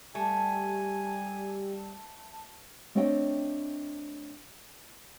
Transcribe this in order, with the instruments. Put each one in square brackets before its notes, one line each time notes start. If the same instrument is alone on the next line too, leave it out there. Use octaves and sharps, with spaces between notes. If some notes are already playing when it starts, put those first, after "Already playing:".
[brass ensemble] G3 [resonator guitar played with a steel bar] A3 [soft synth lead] G4 [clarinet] G#5
[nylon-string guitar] A3 C4 D4 C#5 D#5 G5